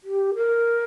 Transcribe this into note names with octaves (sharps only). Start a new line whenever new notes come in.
G4
A#4